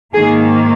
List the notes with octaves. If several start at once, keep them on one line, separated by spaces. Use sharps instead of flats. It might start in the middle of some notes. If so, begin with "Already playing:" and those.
G#2 D#3 A#3 G#4